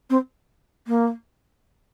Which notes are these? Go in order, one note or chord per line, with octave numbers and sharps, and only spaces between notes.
C4
A#3